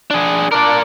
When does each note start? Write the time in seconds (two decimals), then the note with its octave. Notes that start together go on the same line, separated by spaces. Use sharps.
0.11 D4 G#4
0.52 D4 A#4 D5